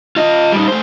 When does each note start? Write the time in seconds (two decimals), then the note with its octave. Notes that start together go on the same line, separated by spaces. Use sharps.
0.16 F4 D#5
0.52 G3 D#4
0.68 A3 C5